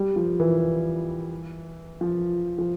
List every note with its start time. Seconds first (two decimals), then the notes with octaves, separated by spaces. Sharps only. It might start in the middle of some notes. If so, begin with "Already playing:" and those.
Already playing: G3
0.16 F3
0.40 E3
2.01 F3
2.58 F3